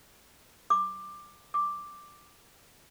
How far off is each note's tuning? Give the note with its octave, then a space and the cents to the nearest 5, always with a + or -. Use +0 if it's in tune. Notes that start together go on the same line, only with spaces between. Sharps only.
D6 +15
D6 +0